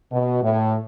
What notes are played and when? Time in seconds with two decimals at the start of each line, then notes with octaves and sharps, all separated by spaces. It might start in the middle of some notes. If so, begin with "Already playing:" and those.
0.12 B2
0.42 A2